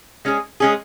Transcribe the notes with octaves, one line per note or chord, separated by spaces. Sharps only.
G#3 C#4 G#4
G#3 C#4 G#4